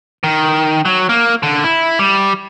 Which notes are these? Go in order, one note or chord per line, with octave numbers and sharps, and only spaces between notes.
D#3
F#3
A#3
D3
E4
G3